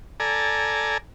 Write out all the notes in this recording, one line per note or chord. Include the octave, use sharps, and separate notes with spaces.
A4 D5 G#5 A#5